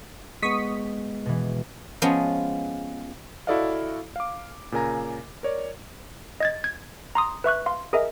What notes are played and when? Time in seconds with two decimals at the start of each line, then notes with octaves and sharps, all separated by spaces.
0.43 G#3 B3 C#6 D#6 B6
1.25 B2 E3
2.02 F3 G#3 B3 C#4
3.47 E4 F#4 A4 D5 D#5 F5
4.16 F5 D6
4.72 A#2 C#3 A#4 G#5 A#5
5.43 A#4 C#5 D5
6.40 D#5 G#6 A6
6.64 G#6
7.15 A#5 C6 D#6
7.44 B4 E5 C#6 F#6
7.66 F5 C6
7.93 G#4 A#4 D#5 E5